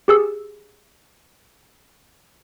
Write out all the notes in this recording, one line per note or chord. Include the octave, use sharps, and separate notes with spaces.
G4 G#4 E6